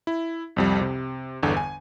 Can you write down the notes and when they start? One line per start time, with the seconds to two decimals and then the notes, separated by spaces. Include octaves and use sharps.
0.07 E4
0.56 C2 F2 G3
0.81 C3
1.43 G1 E2 D3
1.57 G#5